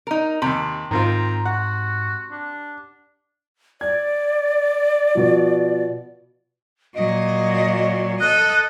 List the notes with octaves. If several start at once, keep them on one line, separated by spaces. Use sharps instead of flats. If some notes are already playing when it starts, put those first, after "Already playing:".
D#4 A#4
D#2 C3 B5
G#2 D#3 C4 F4 A#5
F#4 F#5
D4
D5 G#6
B2 F3
A#2 F#3 D#5
A4 D#5 F#6